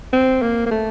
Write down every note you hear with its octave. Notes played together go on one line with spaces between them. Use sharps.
C4
A#3
A#3
A3